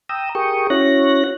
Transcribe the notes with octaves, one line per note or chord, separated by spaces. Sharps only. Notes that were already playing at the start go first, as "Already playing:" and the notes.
G5 A#5 D#6 E6
G4 G#4 A#4 G5 C#6 D#6
C#4 E4 F#4 C#5 F#6 A#6